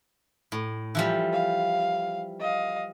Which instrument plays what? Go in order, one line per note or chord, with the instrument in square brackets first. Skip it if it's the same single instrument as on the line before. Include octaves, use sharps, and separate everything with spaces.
[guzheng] A2
E3 F3 G3
[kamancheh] F5
D#5 F5